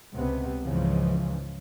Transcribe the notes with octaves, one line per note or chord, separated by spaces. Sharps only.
C#2 C3 B3
C#2 G#2 C#3 E3 F3